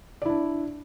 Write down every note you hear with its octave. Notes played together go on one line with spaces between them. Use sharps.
D4 E4 D5